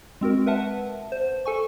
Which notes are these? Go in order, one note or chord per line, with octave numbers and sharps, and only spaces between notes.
G#3 C4 F#4 A#4
A#4 B4 E5 F#5 A5
C5
A4 G#5 C#6